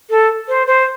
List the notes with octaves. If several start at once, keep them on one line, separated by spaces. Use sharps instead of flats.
A4
C5
C5